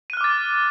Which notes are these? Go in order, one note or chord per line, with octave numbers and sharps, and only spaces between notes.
D6 F6 F#6 A6 D#7